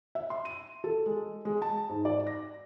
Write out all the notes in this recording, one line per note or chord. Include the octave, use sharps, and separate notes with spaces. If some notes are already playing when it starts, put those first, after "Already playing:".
E5
C6
D#7
A4
G#3
G#3
A5
G#2
D5
A#6